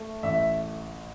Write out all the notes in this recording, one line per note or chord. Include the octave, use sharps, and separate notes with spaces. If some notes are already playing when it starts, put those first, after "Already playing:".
Already playing: A3
A1 E5